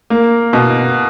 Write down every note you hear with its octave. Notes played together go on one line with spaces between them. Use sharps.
A#3
B2